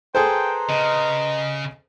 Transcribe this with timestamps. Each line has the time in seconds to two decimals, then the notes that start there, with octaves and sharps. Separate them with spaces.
0.15 G#4 A4 B4 C5 G5 A#5 C6
0.70 C#3 D#5